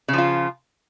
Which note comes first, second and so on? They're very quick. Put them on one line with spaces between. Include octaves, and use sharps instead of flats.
C#3 F3 F4